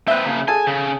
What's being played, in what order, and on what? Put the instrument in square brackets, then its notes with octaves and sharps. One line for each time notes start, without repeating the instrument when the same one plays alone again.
[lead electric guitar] C4 B4 [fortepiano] E5 F#6
[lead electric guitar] C#3 A#3
[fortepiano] G#4 A4 A5 [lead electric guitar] G#5
[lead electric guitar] C#3